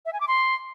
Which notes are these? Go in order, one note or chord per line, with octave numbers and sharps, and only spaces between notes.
E5
G#5
D6
C6